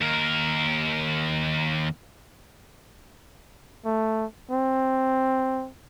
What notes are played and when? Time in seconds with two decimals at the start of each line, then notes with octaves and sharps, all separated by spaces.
0.01 D#2 A#4
3.85 A3
4.51 C4